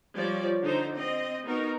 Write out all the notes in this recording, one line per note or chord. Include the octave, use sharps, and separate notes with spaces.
F3 G3 C#5 D5
D3 D#4 C5
C4 D#5
B3 D#4 F#4 A#4